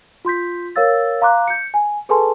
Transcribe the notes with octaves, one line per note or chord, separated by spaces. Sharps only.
F4 C6 G6 B6
A#4 C#5 F5 E6 A6
F5 A#5 C6 D6 F#6
G6 C#7
G#5
G#4 A4 B4 G#5 A5 C6